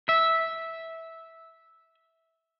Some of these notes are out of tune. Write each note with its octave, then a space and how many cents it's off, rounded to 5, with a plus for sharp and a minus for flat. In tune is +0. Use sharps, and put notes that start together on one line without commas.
E5 -10